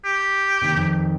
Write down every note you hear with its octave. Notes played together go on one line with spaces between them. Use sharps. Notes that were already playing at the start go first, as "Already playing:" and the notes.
G4
C3 D#3 A#3
F2 D#3